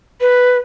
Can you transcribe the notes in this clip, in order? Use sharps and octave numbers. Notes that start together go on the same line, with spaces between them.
B4